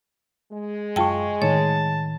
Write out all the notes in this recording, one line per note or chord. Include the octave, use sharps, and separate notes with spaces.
G#3
F#2 F4 G5 A5 C#6
A2 D#3 C#5 A5